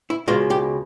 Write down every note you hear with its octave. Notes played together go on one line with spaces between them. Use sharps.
E4
C#2 B2 G#3 F4
G4